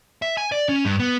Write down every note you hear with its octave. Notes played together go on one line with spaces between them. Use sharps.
E5
G#5
D5
C#4
G2
B3